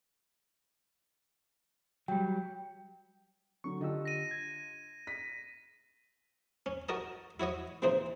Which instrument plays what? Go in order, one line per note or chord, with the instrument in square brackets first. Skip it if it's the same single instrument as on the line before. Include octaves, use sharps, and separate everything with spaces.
[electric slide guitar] F#3 G3 [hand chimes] G5
[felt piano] D3 F#3 [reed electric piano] C#6
[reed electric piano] D3 G4 E6 [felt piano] D4 F4 D#5
[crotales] A#6 D#7
[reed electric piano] G#6
[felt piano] B6
[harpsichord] C#4
F#4 A#4 D#5 A5
E4 F#4 C#5 D#5
A#2 C#3 E3 C4 D#4 C5